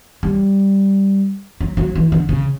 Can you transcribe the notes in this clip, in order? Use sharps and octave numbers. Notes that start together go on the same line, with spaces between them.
G3
F#3
F#3
E3
D3
C#3